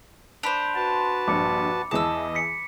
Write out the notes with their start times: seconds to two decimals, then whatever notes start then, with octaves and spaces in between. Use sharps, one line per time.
0.43 D4 C5 B5 B6 F7
0.75 F#4 B4 A5
1.28 A#1 G2 D6 C#7
1.91 E2 E3 G#4 D#5 A5 E6
2.35 B6 C#7